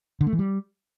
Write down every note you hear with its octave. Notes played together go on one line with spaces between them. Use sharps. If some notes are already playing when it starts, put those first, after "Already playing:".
D3
A3
E3
G3